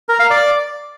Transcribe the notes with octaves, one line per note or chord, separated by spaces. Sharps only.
A#4
F5
D5